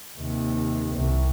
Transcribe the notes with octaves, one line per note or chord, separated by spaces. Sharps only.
D#2 C3
C2